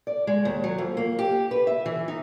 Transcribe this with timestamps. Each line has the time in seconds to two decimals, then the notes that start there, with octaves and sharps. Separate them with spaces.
0.07 D5
0.27 G#3
0.45 D#2
0.64 F#3
0.78 F2
0.97 A#3
1.19 G4
1.51 B4
1.67 E5
1.86 E3
2.08 D#4